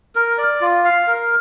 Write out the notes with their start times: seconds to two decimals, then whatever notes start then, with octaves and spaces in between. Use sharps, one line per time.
0.16 A#4
0.38 D5
0.61 F4
0.85 F5
1.07 A#4